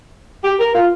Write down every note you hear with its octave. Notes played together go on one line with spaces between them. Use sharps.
G4
A#4
F4